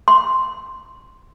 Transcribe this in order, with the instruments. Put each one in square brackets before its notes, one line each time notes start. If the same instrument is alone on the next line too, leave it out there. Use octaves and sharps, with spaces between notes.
[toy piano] C6